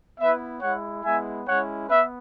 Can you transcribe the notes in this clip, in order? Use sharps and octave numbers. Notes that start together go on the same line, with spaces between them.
B3 E4 B4 E5
G#3 E4 C#5 F#5
G#3 B3 E4 E5 G#5
G#3 C#4 E4 C#5 F#5
B3 B4 E5